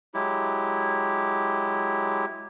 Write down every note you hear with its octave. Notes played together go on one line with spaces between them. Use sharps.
F#3 G#3 E4 G4